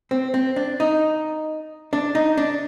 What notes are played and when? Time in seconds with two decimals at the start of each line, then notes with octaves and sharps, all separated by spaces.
0.11 C4
0.34 C4
0.56 D4
0.80 D#4
1.93 D4
2.15 D#4
2.38 D4